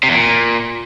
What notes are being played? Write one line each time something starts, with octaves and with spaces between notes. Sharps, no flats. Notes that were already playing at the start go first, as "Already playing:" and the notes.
C3
E2
A#2